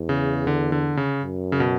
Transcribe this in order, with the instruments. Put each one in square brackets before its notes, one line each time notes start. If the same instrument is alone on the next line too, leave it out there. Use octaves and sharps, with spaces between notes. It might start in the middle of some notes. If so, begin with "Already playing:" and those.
Already playing: [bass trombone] E2
[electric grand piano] C#3
D3
D3
C#3
[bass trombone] F#2
[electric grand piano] C#3
B2